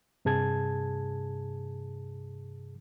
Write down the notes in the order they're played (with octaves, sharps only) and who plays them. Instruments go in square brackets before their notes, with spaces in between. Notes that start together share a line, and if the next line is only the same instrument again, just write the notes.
[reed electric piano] G2 C3 G#4 A5 G#6